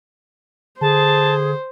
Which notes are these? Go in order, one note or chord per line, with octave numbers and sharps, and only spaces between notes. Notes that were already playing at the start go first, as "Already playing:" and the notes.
D3 G#4 C5 A5